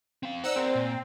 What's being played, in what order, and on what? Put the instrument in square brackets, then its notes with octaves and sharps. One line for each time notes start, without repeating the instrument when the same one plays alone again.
[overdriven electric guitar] C4 F5
[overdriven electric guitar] D#4 [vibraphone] C5 D5 [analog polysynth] F#5 E6
[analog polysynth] C4 [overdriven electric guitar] G4 A#4
[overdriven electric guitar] A#2